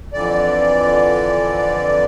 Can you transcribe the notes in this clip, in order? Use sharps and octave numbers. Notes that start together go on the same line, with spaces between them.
F2 D3 E3 D5